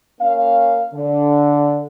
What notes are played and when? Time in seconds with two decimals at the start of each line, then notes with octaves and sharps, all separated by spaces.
0.20 A#3 C#4 F5
0.94 D3